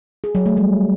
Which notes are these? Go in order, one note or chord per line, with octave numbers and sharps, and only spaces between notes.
G#4
F#3
A3
G3